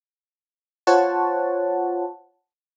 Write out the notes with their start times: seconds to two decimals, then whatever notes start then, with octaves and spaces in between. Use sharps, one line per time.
0.87 F4 C5 C#5 F#5 A5